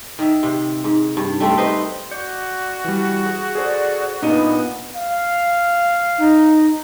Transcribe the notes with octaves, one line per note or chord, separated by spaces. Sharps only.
D#3 E5
C3
G#2
G2
G3 A3 C4
D#4 B4 C5
F#4 D5 G6 C#7
E3 G3
G#4
G#4 A4 C5 D5
A#2 B3 D4 D#4 C#7 D#7
F5
D#4